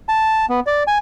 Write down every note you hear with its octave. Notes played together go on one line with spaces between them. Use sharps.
A5
B3
D5
G#5